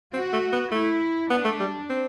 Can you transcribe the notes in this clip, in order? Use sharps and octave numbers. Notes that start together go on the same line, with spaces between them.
C4 F#4
A3
B3
A3 E4
B3 D4
A3
G3
C4